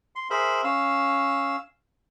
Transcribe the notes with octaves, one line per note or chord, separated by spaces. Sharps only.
C6
G#4 A#4 C5 E5 B5
C#4 F5 E6